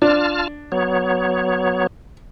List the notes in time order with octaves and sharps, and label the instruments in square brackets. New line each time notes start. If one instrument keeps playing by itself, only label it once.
[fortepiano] D4 [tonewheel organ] F4 A5 F6
[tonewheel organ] F#3 B3 C#5